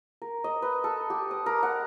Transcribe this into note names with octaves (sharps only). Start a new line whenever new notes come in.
A#4
D#5
B4
A4
G4
D#6
A#4
F#5